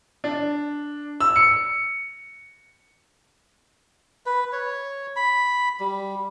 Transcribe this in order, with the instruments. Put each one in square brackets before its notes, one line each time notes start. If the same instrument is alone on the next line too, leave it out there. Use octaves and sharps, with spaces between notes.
[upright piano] D4
E6
C#7
[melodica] B4
C#5
B5
G3